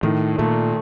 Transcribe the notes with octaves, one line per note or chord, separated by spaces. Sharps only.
A2 D#3
A#2 A3